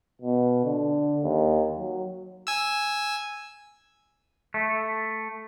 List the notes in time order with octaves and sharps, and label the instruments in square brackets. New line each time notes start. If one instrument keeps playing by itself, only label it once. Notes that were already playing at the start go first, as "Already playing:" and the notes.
[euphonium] B2
D3
D#2
F#3
[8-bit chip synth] G#5 E6
[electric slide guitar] A3